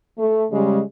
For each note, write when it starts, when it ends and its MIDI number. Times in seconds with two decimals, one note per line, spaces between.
0.19 0.45 57
0.52 0.81 49
0.52 0.81 55
0.52 0.81 56